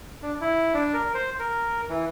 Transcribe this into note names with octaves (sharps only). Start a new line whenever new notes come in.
D4
E4
D4
A#4
C5
A#4
E3